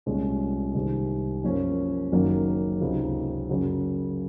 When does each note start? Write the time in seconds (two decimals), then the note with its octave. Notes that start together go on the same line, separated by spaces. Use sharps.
0.06 C2 A#2 G#3 C#4
0.75 C2 C3 D#3
1.44 F#2 F3 A#3 C#4
2.12 F#1 F#2 D#3 F#3 A#3
2.81 C#2 C3 F#3 C4 D#4
3.49 F#2 C#3 F#3